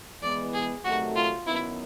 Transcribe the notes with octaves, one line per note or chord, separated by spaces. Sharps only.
E3 G#3 B3 D5
G#4
C3 D#3 F#3 A3 F#4
F4
F#2 D#3 F#3 B3 E4